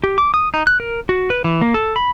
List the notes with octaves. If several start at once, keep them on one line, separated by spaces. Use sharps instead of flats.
G4
D6
D#6
D#4
F#6
A#4
F#4
B4
E3
A#3
A4
B5